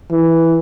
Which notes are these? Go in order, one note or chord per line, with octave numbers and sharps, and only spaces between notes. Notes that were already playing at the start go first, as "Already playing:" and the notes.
E3